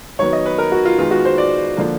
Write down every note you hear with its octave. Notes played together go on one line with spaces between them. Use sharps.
D#3 F#3 B3 C#5
D#5
B4
A#4
F#4
F4
D#3 G#3 B3 F4
F#4
C5
D5
D3 F3 A#3